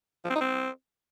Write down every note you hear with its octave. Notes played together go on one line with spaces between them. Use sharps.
F3
C4
D#4
C4